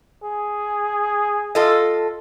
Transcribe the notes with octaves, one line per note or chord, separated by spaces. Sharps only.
G#4
F4 A4 D#5